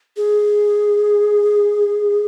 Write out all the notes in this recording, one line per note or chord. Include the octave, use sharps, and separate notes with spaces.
G#4